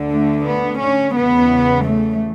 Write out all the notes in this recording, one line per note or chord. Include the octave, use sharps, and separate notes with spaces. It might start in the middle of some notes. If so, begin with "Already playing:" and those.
Already playing: D2 D3
A3
B3
C#4
E2 C#3 E3 B3
A3